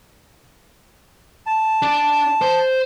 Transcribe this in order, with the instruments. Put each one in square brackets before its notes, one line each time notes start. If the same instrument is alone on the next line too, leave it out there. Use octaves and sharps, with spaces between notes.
[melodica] A5
[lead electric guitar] D4
C5